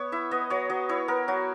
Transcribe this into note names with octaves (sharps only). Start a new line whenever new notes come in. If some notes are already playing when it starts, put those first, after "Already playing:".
Already playing: B3 C#5
E4 E5
B3 D#5
F#3 C#5
F#3 D#5
E4 C#5
B3 A#4
F#3 F#4